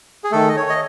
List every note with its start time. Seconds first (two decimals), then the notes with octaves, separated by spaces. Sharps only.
0.24 G#4
0.32 D#3 A3 A4
0.49 D#5
0.57 C#5
0.69 D#5